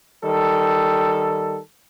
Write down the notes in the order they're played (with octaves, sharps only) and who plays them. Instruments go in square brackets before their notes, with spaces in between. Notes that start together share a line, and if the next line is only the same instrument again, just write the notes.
[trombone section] D#3 G3 A4